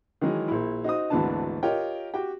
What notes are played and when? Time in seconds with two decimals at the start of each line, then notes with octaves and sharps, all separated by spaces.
0.21 D#3 E3 F#3 G#3
0.48 A#1 E4
0.84 D#4 F#4 C5 D#6
1.10 G#1 D2 E3 B3 D4 A5
1.63 F4 G4 A#4 C#5 D#5 G5
2.14 F#4 G4 G5